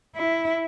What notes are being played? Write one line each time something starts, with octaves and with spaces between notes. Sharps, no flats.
E4